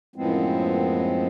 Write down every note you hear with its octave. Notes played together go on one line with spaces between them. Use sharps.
F#2 A2 F3 G#3 B3 C4